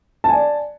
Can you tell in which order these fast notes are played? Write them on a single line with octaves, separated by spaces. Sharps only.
A5 G#5 D5